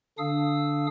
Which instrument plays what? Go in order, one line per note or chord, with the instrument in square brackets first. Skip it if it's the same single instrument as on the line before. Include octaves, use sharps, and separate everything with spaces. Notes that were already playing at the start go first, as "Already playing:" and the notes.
[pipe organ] D3 D4 F5 D#6 E6